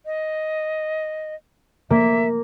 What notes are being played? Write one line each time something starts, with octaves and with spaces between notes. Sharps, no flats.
D#5
A#3 E5